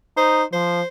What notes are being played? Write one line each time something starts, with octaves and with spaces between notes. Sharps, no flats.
D#4 C5
F3 C5